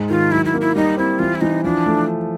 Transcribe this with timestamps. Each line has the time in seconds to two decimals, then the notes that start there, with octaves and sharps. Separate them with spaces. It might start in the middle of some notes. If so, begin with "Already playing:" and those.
Already playing: G#2 G#3
0.09 D#3 F4
0.32 F#3 E4
0.45 E4
0.54 A#3
0.61 E4
0.76 G3 D#4
0.97 C4 E4
1.19 E3 F4
1.35 E4
1.41 E3 D#4
1.64 F3 D4
1.86 A3